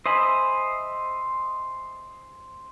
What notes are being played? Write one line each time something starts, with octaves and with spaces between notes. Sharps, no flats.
C5 D#5 E5 G#5 B5